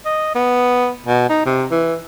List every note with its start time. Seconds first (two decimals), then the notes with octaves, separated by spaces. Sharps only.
0.06 D#5
0.35 B3
1.07 B2
1.30 D#4
1.46 C3
1.71 E3